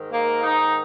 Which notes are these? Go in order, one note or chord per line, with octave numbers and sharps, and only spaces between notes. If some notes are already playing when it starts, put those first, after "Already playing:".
Already playing: G#2 D#3
A#3
D#4